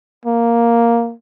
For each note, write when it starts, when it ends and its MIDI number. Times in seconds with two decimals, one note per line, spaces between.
0.26 1.14 58